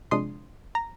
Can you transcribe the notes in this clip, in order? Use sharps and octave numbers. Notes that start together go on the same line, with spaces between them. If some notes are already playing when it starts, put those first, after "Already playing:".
C3 F3 G#3 D4 C6 D#6
A#5